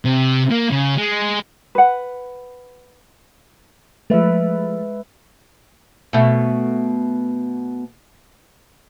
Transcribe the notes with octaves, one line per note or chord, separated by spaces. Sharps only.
C3
A#3
C#3
G#3
B4 F#5
F3 G#3 A3 B4 E5
B2 A3